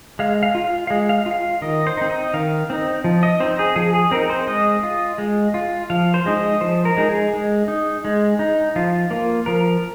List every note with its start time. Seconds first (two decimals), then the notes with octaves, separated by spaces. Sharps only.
0.19 G#3 F5
0.43 F5
0.55 F4
0.64 F5
0.87 G#3 F5
1.09 F5
1.26 F4 F5
1.62 D#3 D#5
1.87 C5
1.97 C4 D#4
2.10 D#5
2.34 D#3 F5
2.70 C4 D#4
3.04 F3
3.23 D#5
3.40 C4 D#4 C5
3.59 G#4
3.76 F3 G#4
3.94 G#4
4.11 C4 D#4 A#4
4.30 C5
4.47 G#3 D#5
4.83 F4
5.18 G#3
5.54 F4
5.90 F3 F5
6.14 C5
6.26 G#3 D#4
6.37 D#5
6.61 F3 C5
6.85 A#4
6.97 G#3 D#4
7.09 G#4
7.33 G#3
7.68 D#4
8.05 G#3
8.39 D#4
8.76 F3 F4
9.11 A#3 F4
9.46 F3 A#4